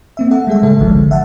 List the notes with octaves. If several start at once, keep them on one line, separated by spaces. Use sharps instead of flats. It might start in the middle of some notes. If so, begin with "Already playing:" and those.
A#3 C4 E5
A4 E5 F#5
G3 G#3 G#4 E5
A2 C#3 G#3 A4
G1 C2 D3 F3 G#3
E5 F#5 A5